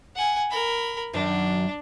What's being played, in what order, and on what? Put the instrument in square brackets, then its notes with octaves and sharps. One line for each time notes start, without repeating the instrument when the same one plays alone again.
[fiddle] F#5 G#5
A#4 B5
[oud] F#2 D#3 F#3 [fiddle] D4